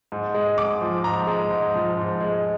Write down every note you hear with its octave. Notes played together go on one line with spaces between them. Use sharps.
G#2
G#3
G#2 D6
F3
G#2 A#5
G#3
G#2
F3
G#2
G#3